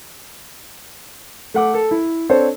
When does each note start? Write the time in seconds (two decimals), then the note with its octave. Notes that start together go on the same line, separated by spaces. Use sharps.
1.54 A3 F#5 D6
1.74 A4
1.91 E4
2.29 C4 D4 A4 C5 C#5